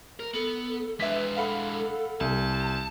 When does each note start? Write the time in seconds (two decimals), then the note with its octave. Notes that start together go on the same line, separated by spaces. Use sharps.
0.20 A#4
0.34 B3 A4
1.00 G#3 D4 B4 E5 B6
1.37 A4 F5 F#5 B5
2.21 C2 A5